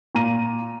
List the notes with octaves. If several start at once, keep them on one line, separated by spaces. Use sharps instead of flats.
A#2 A#5 D#7